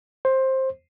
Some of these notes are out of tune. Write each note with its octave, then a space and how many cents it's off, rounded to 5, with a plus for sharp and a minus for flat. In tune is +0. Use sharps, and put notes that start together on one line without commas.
C5 +15